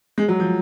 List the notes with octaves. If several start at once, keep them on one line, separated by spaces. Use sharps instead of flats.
G#3
F#3
F3